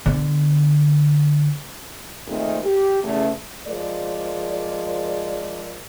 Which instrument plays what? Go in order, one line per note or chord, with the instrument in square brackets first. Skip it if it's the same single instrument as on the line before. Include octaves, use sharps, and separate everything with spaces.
[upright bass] D3 B3
[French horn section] A#2 D#3 G#3 A3 C4
G4
E2 C#3 A3
F3 G#3 A#4 D5